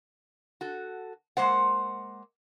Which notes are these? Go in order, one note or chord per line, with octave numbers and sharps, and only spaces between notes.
F#4 A4
G#3 A#3 C5 F#5